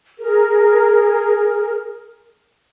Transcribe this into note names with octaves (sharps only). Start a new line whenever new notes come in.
G#4 A#4